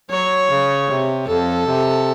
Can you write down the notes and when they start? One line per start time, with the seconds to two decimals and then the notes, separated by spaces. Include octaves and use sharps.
0.10 F#3 C#5
0.50 C#3
0.89 C3
1.27 F2 A4
1.66 C3